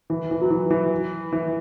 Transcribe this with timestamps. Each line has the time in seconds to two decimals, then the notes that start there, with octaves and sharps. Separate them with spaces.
0.10 E3
0.31 E3
0.41 F#3
0.50 E3
0.71 E3
1.33 E3